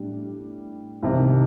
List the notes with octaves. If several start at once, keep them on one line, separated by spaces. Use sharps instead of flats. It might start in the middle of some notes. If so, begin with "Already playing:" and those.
Already playing: A2 G3 D4
C2 C3 D#3